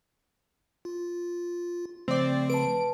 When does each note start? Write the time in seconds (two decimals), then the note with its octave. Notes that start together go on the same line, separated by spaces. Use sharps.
0.85 F4
2.08 C#3 F3 A3 C4 D5
2.50 B4 A5 D7